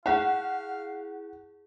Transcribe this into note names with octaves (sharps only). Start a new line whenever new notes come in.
E4 G#4 F5 F#5